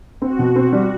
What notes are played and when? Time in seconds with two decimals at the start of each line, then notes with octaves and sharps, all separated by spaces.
0.21 C4 F#4
0.39 B2
0.56 C4
0.72 G3